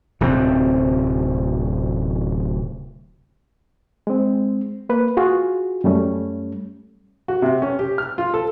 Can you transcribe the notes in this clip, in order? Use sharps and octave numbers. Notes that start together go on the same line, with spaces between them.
D1 D2 C3 C4
G#3 C4
A#3 B4
F4 F#4 G#4
F#2 G3 A3 C#4
F#4
C3
C#4
G4
F6
F4
A4